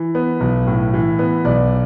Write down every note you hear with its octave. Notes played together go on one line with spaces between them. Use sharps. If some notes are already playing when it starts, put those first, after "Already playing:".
Already playing: E3
B3
B1
A2
E3
B3
B1 D5